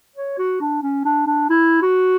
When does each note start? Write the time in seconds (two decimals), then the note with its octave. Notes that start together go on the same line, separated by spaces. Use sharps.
0.16 C#5
0.38 F#4
0.61 D4
0.83 C#4
1.05 D4
1.27 D4
1.49 E4
1.82 F#4